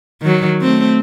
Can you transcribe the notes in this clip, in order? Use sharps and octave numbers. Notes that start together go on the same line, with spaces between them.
D#3 F#3
A3 C4